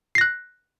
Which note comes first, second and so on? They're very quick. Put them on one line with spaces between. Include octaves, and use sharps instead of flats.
C7 A#6 F#6